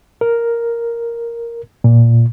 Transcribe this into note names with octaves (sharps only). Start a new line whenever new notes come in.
A#4
A#2